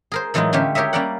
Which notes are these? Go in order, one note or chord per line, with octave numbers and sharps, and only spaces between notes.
G#4 A#4 C5
A2 E3 F#3 G#3 D#4 F4
D3 G#3 A3 C#4 G4 F5
G4 A#4 C#5 D#5 E5
G3 A#3 C#4 A#4 D5 F#5